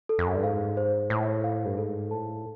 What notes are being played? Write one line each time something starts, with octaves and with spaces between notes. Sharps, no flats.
A4
F2
F#2
G2
G#2 F5
C5
A2 C5
F5
G2
G#2 A4
A2 A5